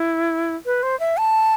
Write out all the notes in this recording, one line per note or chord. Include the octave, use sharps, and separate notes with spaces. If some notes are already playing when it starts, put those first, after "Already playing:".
Already playing: E4
B4
C5
E5
A5